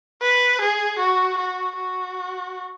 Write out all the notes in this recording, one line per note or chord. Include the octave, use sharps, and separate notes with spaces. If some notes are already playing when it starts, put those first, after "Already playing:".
B4
G#4
F#4
F#4
F#4